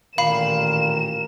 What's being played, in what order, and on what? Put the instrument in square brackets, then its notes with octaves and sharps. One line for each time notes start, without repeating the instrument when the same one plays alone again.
[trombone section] A1 A#2 A#4 [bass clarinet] D#3 [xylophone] F5 B5 C7 [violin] E7